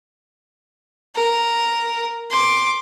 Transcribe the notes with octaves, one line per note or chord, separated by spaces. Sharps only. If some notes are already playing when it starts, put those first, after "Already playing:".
A#4
C6 D6